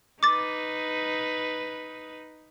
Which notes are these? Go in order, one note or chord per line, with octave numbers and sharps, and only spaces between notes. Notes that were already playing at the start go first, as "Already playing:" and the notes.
D#4 B4 D6 A6